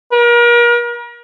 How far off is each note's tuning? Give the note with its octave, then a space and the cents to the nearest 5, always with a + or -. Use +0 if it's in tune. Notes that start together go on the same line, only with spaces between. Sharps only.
A#4 +35